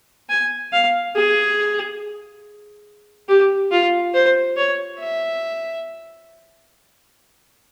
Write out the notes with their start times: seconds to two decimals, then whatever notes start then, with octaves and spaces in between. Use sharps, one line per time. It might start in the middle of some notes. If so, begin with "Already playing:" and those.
0.30 G#5
0.73 F5
1.15 G#4
3.28 G4
3.72 F4
4.14 C5
4.57 C#5
4.99 E5